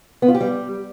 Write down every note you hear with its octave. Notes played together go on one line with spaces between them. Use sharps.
B3
F4
G4
G3